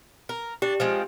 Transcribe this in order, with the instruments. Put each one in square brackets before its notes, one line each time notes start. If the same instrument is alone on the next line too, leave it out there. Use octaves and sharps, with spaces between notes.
[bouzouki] A#4
[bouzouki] D4 [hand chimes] G4
[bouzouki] F3 G#3 C4